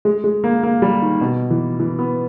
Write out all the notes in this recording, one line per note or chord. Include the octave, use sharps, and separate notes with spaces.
G#3
G#3
A#3
A#3
G3
D#3
B2
E3
E3
B3